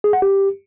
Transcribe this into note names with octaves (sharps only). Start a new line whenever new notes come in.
G#4
F#5
G4